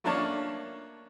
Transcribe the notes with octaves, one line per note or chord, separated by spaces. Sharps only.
A3 A#3 C#4 D4 C#5 A5